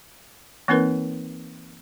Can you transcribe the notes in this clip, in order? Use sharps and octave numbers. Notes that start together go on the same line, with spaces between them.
E3 A#3 C4 D#4 A#4 B4